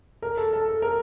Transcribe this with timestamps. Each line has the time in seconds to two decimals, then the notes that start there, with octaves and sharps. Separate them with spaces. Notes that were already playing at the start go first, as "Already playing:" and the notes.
0.22 A#4
0.37 A4
0.53 A4
0.68 A4
0.82 A#4